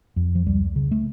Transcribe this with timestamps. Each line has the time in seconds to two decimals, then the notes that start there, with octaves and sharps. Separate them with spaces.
0.16 F2
0.35 F3
0.47 C#2 G3
0.76 C#3
0.91 A3